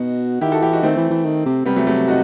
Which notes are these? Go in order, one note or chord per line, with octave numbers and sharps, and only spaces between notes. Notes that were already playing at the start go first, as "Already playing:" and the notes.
Already playing: B2 D#4 F#4
D#3 E4 G4
F#4 A4
E3 E4 G4
D#4 F#4
D#3 A3 C4
E3
E3
D#3
C3
C3 G3 B3
F#3 A3
F#3 A3
D#4 F#4